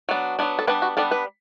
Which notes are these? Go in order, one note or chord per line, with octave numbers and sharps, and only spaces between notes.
F#3 B3 D4
F#3 B3 D4
A4
G3 B3 D4 B4
F#4
G3 B3 D4 A4
B4